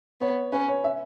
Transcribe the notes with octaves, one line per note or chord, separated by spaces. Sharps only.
B3 C#5
C#4 B4
C#5
E5